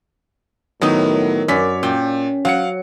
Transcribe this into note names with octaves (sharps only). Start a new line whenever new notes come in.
A2 D#3 F#3 B3 D#4
F#2 C#5 D5 B6
A#2 C#4 G5
F#3 F5 F#5 C#7